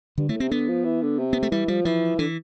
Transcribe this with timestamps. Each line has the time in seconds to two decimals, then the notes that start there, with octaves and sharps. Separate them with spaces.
0.18 G2 D3
0.29 A2 A3
0.40 C3 C4
0.51 D3 B3
0.68 F3
0.85 E3
1.02 D3
1.18 C3
1.33 B3
1.43 A3
1.51 E3 G3
1.68 F3 G3
1.85 E3 F3
2.18 D3 E3